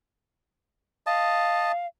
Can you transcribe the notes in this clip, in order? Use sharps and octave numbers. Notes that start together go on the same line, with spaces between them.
D#5 F5 A5